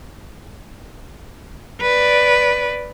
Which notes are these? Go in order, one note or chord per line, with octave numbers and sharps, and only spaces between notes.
B4 D5